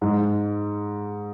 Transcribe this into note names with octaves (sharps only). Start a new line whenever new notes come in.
G#2